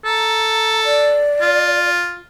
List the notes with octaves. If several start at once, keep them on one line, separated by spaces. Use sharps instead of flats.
A4 A#5
D5
F4